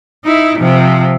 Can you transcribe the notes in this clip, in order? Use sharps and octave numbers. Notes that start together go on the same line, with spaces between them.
D#4 E4
C3 F3